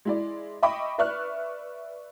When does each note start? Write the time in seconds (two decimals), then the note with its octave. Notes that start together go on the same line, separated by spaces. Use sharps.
0.05 G#3 E4 D5
0.62 D#5 E5 G5 B5 C#6 D6
0.98 B4 D5 E5 C#6 F6 F#6